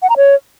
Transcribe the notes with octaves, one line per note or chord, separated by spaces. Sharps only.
F#5
A#5
C#5